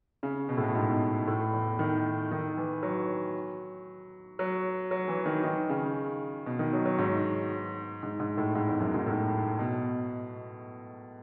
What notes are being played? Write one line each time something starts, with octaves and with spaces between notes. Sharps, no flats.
C#3
B2
A2
B2
G#2
A2
E2
D#3
D#3
E3
F#3
F#3
F#3
E3
D#3
D#3
C#3
B2
D#3
F#3
F#3
G#2
G#2
G#2
A2
G#2
E2
F#2
G#2
A2
B2